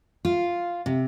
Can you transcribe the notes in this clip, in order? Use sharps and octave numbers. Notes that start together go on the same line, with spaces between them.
F4
C3